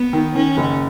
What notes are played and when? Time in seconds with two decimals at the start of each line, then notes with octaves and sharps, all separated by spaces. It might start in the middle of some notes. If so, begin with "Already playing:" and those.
Already playing: B3
0.13 D#3
0.35 D#3 C#4
0.57 F#1